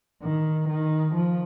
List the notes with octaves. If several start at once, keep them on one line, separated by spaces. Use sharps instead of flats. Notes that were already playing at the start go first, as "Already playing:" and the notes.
D#3
D#3
F3